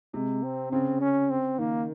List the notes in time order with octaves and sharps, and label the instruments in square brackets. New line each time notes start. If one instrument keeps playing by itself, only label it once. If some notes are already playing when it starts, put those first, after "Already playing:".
[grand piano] C3 [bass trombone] G#3
[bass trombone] C4
[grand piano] C#3 [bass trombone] C4
[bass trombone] C#4
C4
[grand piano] D#3 [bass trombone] A#3